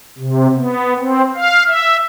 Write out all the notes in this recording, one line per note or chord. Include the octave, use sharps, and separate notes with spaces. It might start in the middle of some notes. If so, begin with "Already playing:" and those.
C3
B3
C4
F5
E5